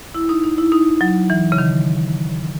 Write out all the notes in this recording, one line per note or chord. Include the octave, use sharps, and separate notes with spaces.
E4
D#4
D#4
E4
D#4
F#3
E3
C#3
D#3